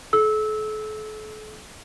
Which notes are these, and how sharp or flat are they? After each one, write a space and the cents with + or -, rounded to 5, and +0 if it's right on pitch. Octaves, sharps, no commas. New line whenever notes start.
A4 -40 E6 -20